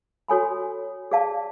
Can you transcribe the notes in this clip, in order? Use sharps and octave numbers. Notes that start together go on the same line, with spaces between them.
F#4 A4 C#5 G#5 B5
G#4 D5 F5 A5